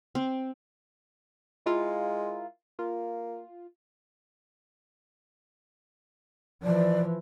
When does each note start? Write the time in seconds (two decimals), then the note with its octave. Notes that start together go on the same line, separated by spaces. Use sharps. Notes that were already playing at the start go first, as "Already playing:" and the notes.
0.15 C4
1.66 G#3 E4 F4 A#4
2.79 A#3 F4
6.63 E3 F3 D5